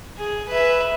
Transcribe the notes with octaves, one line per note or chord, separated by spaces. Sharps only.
G#4
B4 E5